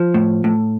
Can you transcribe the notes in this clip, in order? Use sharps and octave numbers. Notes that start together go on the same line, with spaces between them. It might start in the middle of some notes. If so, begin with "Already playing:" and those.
Already playing: F3
A2
A2